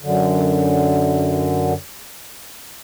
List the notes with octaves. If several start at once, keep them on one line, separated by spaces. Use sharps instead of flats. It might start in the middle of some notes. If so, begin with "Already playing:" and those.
F#2 D3